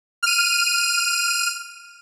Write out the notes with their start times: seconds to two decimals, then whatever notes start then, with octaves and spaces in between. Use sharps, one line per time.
0.23 F6 D#7